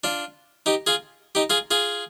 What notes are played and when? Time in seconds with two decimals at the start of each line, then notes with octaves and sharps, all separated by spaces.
0.04 D4 F4
0.66 D#4 G4
0.87 F4 G#4
1.35 D#4 G4
1.50 F4 G#4
1.71 F4 G#4